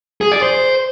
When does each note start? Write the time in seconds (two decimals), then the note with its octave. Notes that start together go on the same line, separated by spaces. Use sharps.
0.21 G#4
0.32 D5
0.42 C5